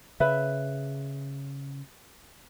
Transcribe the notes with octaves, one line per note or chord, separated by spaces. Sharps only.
C#3 B4 E5